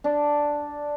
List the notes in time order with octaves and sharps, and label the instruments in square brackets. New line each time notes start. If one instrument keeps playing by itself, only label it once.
[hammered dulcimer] D4